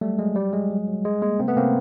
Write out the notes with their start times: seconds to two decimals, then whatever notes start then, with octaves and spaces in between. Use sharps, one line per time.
0.01 F#3 G3 A3
0.18 F#3 G#3
0.36 G3
0.53 G3 G#3
0.71 F#3
0.88 F#3
1.05 G3 G#3
1.22 G3 G#3 A#3
1.40 C3 A#3 C4
1.48 A3 B3
1.56 C3 A#3 C4